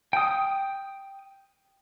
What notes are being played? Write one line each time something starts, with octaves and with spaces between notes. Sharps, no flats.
G5 D#6